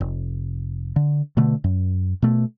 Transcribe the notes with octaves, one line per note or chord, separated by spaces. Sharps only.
F1
D3
B2 D3 A3
F#2
B2 A3